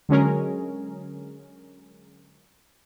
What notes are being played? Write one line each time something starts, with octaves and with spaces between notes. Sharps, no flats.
D3 F#3 G#3 C#4 G#4 A#4